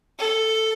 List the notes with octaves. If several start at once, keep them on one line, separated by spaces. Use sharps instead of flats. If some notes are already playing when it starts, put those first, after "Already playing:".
A4